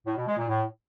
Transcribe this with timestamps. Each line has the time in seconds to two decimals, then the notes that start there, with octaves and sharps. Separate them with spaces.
0.07 A2
0.17 B2
0.27 G#3
0.38 A#2
0.48 A2